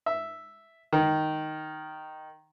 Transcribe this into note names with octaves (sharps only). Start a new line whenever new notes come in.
E5
D#3